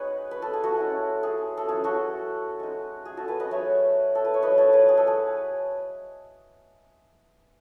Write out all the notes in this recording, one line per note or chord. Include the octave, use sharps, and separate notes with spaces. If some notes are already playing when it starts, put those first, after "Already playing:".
Already playing: G#3 B3 D#4 F#4 G#4 B4 C#5 D#5
B4
A4
G#4
F#4 A4
G#3 C#4 E4
G#4
A4
F#3 C#4 E4 G#4
F#4 A4
G#3 D#4
G#4
F#4 A4
G#4 B4
B4 D#5
F#3 A3 D#4 C#5 E5
A4
B4
C#5
F#3 A3 E4 B4 D#5
A4 C#5
G#4 B4
G#4
A4
G#4